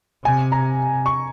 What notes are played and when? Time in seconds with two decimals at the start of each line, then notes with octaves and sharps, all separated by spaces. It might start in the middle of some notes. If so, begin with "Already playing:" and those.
0.24 C3 G#5
0.52 A#5
1.06 C#6